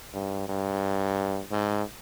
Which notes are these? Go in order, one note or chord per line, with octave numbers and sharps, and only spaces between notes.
G2
G2
G#2